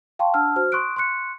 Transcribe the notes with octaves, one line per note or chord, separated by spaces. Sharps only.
F5 G5 A5 C6 C#6
D4 F#5 A5 E6 F6
F#4 C5 F6
C6 C#6 D#6 F#6 D7
C6 C#6 F#6 C#7